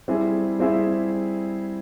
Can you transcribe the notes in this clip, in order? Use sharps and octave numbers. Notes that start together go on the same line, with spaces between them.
G3 C4 E4 G#4 E5
G3 C4 E4 G#4 E5